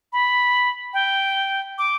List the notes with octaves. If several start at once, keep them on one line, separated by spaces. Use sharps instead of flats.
B5
G5
D6